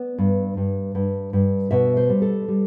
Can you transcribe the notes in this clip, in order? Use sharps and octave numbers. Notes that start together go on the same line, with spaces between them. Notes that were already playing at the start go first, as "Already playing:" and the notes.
Already playing: B3 D5
G2
G2
G2
G2
B2 E5
C5
G3
A4
G3